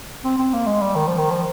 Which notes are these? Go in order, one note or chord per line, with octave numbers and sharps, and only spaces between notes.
C4
C4
A#3
G#3
G3
D#3
F3
D#3
F3